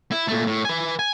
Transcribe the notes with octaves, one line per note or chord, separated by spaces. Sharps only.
E4
A#2 A3
A2
B4 G#5
G#5